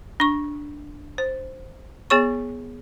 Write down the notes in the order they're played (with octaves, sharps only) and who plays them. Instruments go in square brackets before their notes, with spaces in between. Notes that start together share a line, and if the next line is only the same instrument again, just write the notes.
[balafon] D4 C#6
C5
B3 G#4 C#5 C#6